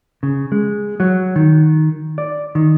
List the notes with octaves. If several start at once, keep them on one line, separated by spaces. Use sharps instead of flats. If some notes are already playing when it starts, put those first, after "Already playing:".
C#3
G#3
F#3
D#3
D5
D#3